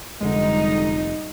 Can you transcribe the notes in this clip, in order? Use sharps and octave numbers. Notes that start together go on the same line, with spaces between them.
F1 D3 G3 G#3 D#4